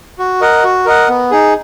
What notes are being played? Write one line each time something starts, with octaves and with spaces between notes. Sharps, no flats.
F#4
A#4 D#5 F#5
F#4
A#4 D#5 F#5
B3
D#4 G#4